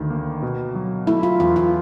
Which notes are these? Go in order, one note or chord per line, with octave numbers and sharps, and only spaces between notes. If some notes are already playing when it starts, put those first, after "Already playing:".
Already playing: D2 D#3
A#3
B2
F#3
A3 E4
F4
E2 F4
F4